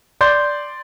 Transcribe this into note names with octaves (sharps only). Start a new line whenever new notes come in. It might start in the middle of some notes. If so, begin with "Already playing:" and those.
D5 C6 G6